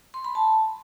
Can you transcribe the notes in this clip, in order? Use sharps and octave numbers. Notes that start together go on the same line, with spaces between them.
C6
B5
A5